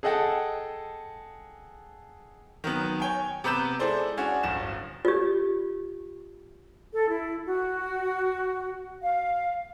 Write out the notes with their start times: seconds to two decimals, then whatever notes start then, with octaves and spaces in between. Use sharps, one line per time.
0.03 G#4 A4 D#5 F#5 G5 A5
2.64 D#3 F#3 B3
3.00 C#5 G5 G#5
3.44 C3 B3 A#5 B5 G6 E7
3.79 G#3 E4 A4 C5 D5
4.17 C#4 D4 F#4 G#4 F#5
4.43 D1 G1 E7
5.05 F4 G4
6.94 A4
7.08 E4
7.45 F#4
9.02 F5